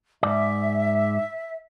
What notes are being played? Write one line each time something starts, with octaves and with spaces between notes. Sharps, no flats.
G#2 D5 E5